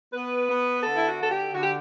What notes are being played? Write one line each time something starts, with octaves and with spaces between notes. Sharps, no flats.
B3 B4
B3
D3 A4
E4
F#4
D3 A4
G4
D3 F#4
G4